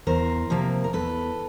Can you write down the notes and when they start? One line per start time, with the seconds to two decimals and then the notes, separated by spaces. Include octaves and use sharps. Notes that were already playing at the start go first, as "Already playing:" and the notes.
0.07 E2 A#4 C5
0.50 C3 F3 A#3
0.84 A#4
0.93 E2 A4 B4